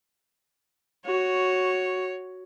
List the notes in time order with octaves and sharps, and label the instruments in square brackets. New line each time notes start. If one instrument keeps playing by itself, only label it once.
[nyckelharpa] F#4 [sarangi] C#5